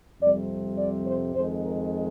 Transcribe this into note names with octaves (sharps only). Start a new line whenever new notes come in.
F2 C3 G3 D5
D5
C5
F2 D#3 G#3 C5
A#4